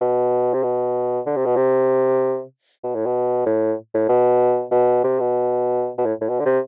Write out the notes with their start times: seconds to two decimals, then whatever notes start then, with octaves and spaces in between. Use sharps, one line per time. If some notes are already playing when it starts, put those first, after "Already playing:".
0.01 B2
0.54 C3
0.63 B2
1.26 D3
1.36 C3
1.46 B2
1.56 C3
2.83 B2
2.95 A2
3.06 B2
3.46 A2
3.94 A2
4.09 B2
4.71 B2
5.04 C3
5.20 B2
5.98 B2
6.06 A2
6.21 A2
6.29 B2
6.40 D3
6.45 C3